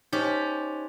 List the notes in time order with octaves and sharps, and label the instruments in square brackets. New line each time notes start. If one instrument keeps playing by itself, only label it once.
[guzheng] C#4 G4 [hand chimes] D#4 C5